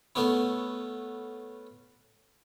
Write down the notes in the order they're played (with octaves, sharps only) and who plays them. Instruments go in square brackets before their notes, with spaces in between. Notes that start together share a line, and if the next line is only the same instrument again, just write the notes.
[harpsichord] A3 B3 C#4 E4